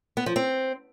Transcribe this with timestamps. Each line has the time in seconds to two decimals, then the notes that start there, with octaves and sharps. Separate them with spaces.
0.17 B3
0.26 F3
0.36 C4